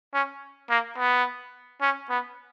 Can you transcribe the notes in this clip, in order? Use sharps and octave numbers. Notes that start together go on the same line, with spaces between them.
C#4
A#3
B3
C#4
B3